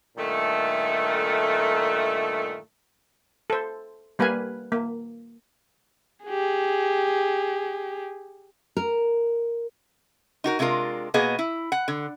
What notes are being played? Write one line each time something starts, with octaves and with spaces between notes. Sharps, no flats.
G2 A#2 D#3 A3
A4 C5
G3 A#3 B4 F5 G#5
A#3
G4 G#4
A#4
D#4 F#4 A#4
C3 G#3 D4 F4 A#4
B2 A#3 B3 G#4 D#5
E4
F#5
D3